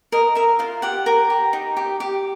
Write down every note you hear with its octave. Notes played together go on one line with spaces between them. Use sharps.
A#4 D#5
A#4 E5
F4 F5
G4 F#5
A#4
G4
D#4
G4
G4